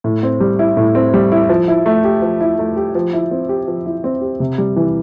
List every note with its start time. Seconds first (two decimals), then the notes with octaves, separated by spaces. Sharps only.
0.04 A2
0.23 C4
0.40 G3
0.59 E4
0.77 A2
0.95 C4
1.14 G3
1.32 E4
1.49 F3
1.68 E4
1.86 A3
2.04 G4
2.22 F3
2.41 E4
2.59 A3
2.77 G4
2.95 F3
3.13 E4
3.31 C4
3.49 G4
3.68 F3
3.86 E4
4.04 C4
4.21 G4
4.40 C3
4.58 G3
4.76 E3